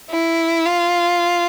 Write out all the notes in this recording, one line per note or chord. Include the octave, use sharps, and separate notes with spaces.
E4
F4